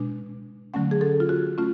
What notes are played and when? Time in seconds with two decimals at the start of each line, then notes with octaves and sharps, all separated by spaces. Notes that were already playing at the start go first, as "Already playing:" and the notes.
Already playing: B2 G#3 D4
0.74 D3 F#3 A3 C#4 F#5
0.91 G#4
1.01 A4
1.20 F4
1.29 F#4
1.58 A3 C#4 F4